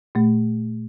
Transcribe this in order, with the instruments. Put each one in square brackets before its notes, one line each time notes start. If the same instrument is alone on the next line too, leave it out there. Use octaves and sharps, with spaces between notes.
[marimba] A#2 A3